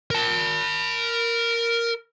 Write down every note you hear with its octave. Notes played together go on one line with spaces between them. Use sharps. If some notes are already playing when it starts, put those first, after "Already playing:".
A#4 A5